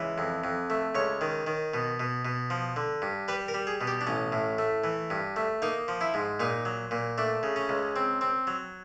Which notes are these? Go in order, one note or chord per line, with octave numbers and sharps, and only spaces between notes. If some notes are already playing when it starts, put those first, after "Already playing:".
Already playing: C#2 E3
F2
F2
A3
C#2 C#5
D#3
D#3
B2
B2
B2
F3
D3
G2
G3 B4
A#4
G3
G#4
B2
G4
D4
A1 C#4
A2
A3
E3
G2
A3
A#3 D#4
F3
E4
G#2
A#2 D#4
F#3
A#2
A3 D4
C#3
C#4
C#2
C4
C4
F#3